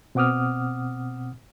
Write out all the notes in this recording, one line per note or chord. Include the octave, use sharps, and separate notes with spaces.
B2 C4 F#5 D6 D#6 F6